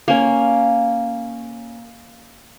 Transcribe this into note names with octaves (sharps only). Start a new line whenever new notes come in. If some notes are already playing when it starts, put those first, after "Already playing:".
A#3 C#4